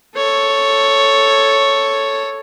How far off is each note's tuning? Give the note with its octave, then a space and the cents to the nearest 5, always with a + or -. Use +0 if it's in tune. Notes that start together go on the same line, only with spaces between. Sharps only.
A4 +0 C#5 +0